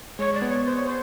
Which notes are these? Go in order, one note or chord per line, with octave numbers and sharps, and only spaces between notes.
G#3 C#5
D5
B3
C#5
C5
C#5
C5